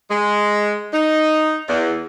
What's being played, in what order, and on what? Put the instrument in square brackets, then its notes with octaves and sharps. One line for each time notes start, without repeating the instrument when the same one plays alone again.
[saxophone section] G#3
D#4
E2